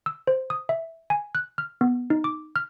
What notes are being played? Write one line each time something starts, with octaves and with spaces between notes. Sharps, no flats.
E6
C5
D#6
E5
G#5
F#6
F6
B3
D#4
D6
F6